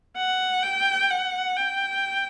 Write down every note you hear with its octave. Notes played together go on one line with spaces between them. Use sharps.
F#5
G5
F#5
G5